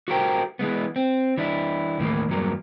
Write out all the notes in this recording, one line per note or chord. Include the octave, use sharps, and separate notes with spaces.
F#4 G4 A4 A#4 C5 G5
E3 F#3 G#3 B3
C4
E3 D4 E4
D#2 A2 E3 A#3
E2 G2 F#3 A#3